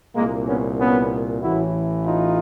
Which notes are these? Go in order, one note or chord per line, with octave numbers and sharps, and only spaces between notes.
C2 A#2 G#3 A#3
B3 C#4
B3 C#4
A1 A2 E3 E4 F#4
D#4 F4